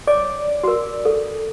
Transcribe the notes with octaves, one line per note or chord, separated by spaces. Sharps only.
C#5 D5 D6
F#4 A#4
A4